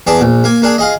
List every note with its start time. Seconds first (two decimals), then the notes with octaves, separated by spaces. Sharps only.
0.07 E2 G#4 D5 A5
0.21 A#1
0.44 A#3 G#5
0.62 A#3 D4 G#4
0.78 F4 G#4 D#5